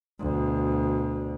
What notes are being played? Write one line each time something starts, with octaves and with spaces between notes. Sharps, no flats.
D2 B2